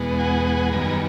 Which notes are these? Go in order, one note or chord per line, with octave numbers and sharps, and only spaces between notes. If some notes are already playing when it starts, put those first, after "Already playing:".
Already playing: E2 B2 G#3 B3
F#5 G#5
F#5 G#5
F#2 D#3 G3 B3 G#5 A#5